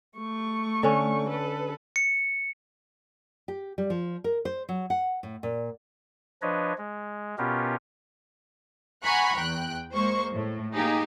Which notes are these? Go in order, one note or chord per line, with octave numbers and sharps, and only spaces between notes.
A3 C#6
D3 C#4
A4 B4
C#7
G4
G3
F3
A#4
C5
F#3
F#5
A2
A#2
F3 D4 B4 C#5 D#5
G#3
B2 B3 C#4 F4 G4 A#4
F#5 G#5 A#5 B5 C#6 F#6
E2 G5 F#6
G#3 A#3 C5 C#6
A2
A#3 D#4 G4 G#4